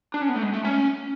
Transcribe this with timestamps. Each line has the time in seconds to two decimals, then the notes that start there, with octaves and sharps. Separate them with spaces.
0.14 D4
0.22 C#4
0.29 B3
0.35 A3
0.43 G#3
0.54 A3
0.64 C#4